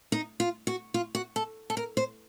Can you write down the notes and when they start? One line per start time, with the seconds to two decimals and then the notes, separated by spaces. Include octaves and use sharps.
0.12 D#4
0.40 F4
0.67 F#4
0.94 F4
1.15 F#4
1.36 A4
1.70 A4
1.77 A#4
1.97 C5